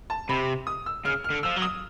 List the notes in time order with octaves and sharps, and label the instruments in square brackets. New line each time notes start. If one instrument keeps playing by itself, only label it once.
[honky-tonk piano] A5
[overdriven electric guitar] C3 [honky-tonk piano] B5
[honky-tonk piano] D#6
E6
[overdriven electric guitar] C#3 [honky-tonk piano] F6
[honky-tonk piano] F6
[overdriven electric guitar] D3
[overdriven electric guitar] F3 [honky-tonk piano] E6
[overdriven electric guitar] F#3
[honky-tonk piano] D#6